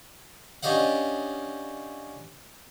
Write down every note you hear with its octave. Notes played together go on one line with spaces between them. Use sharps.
C#4 D4 G4 D#5 F5 F#5